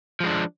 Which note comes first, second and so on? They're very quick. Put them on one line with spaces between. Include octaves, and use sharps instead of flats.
F3 G#3 D4